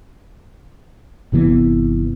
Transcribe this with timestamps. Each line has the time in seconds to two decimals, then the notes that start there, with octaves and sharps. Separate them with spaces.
1.32 G1 C3 E3 B3